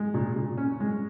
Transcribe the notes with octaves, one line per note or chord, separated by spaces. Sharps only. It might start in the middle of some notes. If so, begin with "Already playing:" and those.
Already playing: G#3
A#2
A#2
C#4
G#3